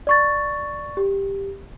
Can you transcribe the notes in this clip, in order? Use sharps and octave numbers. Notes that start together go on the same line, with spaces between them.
D5 C#6 A6
G4